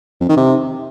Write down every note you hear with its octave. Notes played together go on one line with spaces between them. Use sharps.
F2
D#3
C3